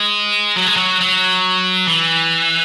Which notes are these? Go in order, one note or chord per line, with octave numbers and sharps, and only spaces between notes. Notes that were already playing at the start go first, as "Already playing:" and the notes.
Already playing: G#3
F#3
G#3
F#3
F#3
E3